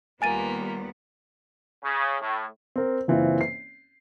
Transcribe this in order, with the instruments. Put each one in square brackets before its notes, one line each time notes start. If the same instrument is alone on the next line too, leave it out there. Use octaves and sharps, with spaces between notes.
[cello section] D#2 G3 B3 [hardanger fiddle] A#3 F4 [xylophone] G#5 A6 D#7
[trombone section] C#3
A2
[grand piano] C4 A#4
F#1 E3 C4 F4
C7